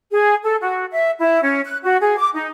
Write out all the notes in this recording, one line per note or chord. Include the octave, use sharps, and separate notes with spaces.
G#4
A4
F#4
E5
E4
C#4
F#6
F#4
G#4
D6
D#4